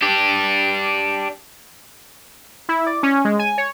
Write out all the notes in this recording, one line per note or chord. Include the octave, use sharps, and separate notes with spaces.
D4 G4
E4
D5
C#4
G#3
G#5
C#5